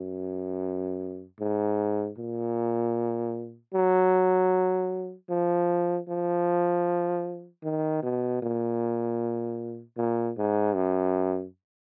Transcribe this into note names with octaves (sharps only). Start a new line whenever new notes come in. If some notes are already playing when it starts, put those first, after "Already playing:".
Already playing: F#2
G#2
A#2
F#3
F3
F3
D#3
B2
A#2
A#2
G#2
F#2